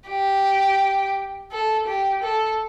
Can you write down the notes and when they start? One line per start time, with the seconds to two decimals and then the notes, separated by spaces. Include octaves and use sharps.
0.09 G4
1.52 A4
1.87 G4
2.23 A4